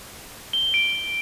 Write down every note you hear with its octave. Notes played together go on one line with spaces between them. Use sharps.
G7
D7